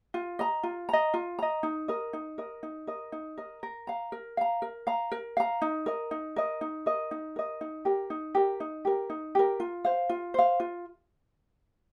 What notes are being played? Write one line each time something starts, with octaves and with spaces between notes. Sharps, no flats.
F4
D#5 A#5
F4
D#5 A#5
F4
D#5 A#5
D#4
A#4 D#5
D#4
A#4 D#5
D#4
A#4 D#5
D#4
A#4 D#5
A#4
F5 A#5
A#4
F5 A#5
A#4
F5 A#5
A#4
F5 A#5
D#4
A#4 D#5
D#4
A#4 D#5
D#4
A#4 D#5
D#4
A#4 D#5
D#4
G4 A#4
D#4
G4 A#4
D#4
G4 A#4
D#4
G4 A#4
F4
C5 F5
F4
C5 F5
F4